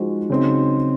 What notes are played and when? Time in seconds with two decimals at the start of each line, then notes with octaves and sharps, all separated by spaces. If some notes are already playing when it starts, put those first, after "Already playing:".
Already playing: F3 G#3 D#4 F#4 C5
0.30 C#3 F#3 C4 D#4